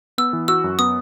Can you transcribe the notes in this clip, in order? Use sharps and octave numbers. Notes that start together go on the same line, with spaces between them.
B3 E6
E3
F#4 E6
F#2
B3 D#6